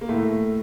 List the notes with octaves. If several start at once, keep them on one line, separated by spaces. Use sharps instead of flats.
A#3
A2 A3